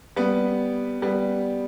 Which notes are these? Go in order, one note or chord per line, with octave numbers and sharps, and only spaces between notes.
G3 B3
G3 B3